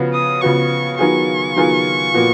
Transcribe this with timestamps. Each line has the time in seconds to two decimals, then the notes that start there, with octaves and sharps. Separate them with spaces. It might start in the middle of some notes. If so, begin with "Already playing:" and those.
Already playing: C#3 F3 B3 F#4
0.14 D#6
0.42 C#3 F3 B3 F#4 C#6
0.99 D#3 F#3 B3 F4 G#4 C#6
1.56 D#3 F#3 B3 F4 G#4
2.14 A#2 F3 B3 F#4